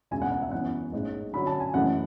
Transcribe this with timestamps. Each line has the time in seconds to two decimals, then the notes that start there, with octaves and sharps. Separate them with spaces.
0.11 E1 D2 C#3 G#5
0.22 F#5
0.32 F#5
0.42 E5
0.52 F#2 E3 B3 F#5
0.92 A1 G#2 G#3 C#4
1.33 F#2 D3 F#3 C#4 B5
1.47 A5
1.60 G#5
1.74 F#1 F#2 E3 A3 F#5